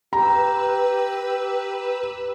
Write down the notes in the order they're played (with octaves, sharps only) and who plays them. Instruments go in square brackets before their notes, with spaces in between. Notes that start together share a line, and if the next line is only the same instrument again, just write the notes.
[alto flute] G4 [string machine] B4 E6 [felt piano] A#5